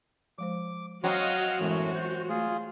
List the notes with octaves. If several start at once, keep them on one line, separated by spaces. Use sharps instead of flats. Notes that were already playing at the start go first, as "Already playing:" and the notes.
F3 G#3 C5 D6
F#3 C4 F#4 D#5 F5 F#5 C6
F#2 A2 E3 G#3 B3 F#4
C5
A3 F4 G#4